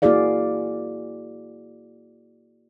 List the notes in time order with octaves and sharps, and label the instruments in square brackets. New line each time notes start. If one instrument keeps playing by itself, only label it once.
[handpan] A#3 E4 F#4 G#4 D5 F5